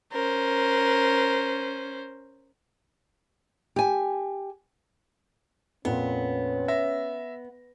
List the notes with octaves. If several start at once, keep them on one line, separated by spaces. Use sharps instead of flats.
C#4 A#4 C5
G4 G#5
F2 A#2 B3 C#4
E5 A#6